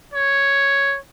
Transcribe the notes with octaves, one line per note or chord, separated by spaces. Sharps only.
C#5